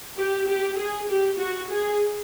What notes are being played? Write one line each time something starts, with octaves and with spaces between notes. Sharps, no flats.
G4
G4
G#4
G4
F#4
G#4